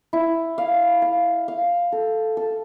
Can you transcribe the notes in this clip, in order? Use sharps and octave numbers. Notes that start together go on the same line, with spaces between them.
E4
F5
F5
F5
A4
A4